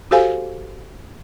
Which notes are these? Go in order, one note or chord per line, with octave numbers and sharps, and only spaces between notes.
F#4 G4 A4 C5 F5 G#5